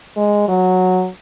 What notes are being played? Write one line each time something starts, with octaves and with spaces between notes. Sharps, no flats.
G#3
F#3